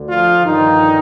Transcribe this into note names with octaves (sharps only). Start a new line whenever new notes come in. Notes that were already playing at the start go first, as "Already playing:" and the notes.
Already playing: D2 D3
F3 F4
G2 D3 D#3 F3 D#4